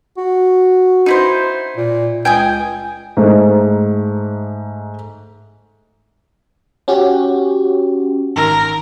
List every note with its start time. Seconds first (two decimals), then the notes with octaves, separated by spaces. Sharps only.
0.17 F#4
1.06 D#4 E4 C5
1.77 A#2
2.25 C#2 G5 G#5 D#6
3.17 G#2 A3 D#4
6.88 C#4 F#4 G4
8.36 G#1 D#3 A#4